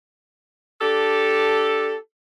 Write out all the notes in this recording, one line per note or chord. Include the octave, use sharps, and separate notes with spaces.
D4 G4 A4